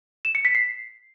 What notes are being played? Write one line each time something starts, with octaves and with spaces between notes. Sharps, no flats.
E7
C#7
B6
C7